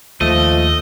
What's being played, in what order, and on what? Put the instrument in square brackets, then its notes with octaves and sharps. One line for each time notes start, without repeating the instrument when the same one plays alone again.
[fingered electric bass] D#2 [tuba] F3 [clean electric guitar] A3 [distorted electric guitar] D#5